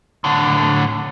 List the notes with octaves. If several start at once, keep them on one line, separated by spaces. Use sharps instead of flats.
A2 D3